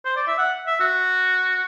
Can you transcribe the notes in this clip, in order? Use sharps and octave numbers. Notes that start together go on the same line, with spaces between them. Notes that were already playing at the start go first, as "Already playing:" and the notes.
C5
D5
E5
F#5
E5
F#4